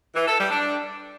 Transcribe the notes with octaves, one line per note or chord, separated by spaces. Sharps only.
E3
A4
G3
D4